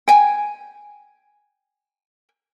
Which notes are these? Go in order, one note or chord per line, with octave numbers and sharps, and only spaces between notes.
G5 G#5